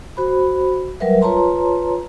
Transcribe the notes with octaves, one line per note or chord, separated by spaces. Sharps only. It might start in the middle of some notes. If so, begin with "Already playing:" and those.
F#4 C5 B5
F#3 G3 A#4 B4 E5
F4 B4 C#5 A5 A#5 C6